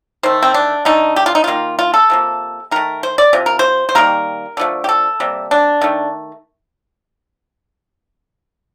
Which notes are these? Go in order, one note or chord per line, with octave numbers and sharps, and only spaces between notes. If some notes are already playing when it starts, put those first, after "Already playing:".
D#3 A3 C5
C4
D4
D3 A3 D#4
G4
F4
D#4
D#3 A#3 F4
F4
A4
C3 F3 A#3
D#3 A3 A#4
C5
D5
C3 F3
A#4
C5
C5
D#3 G3 A#3 A#4
D3 F3 A3
G4
A4
C3 G3 A#3
D4
D#3 A3